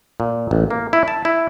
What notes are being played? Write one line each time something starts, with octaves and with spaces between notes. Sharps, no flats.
A#2
A1
A#3
E4
A5
E4